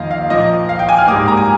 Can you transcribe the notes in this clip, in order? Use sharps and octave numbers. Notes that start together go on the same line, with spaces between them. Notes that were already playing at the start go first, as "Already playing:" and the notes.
Already playing: F2 D#3 A#3 D#5 F5
F5
A#2 F3 A#3 D#5
F5
G5
G#5
F6
G#2 G3 A#3 D#6
A#5
G#5